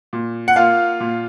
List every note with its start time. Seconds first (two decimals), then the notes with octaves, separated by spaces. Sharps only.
0.13 A#2
0.48 F#5
0.56 A#3 F4 F5
1.00 A#2